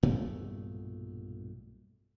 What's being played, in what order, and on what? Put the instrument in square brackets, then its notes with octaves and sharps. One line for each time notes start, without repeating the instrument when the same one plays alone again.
[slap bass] B1 G2 A#2 A3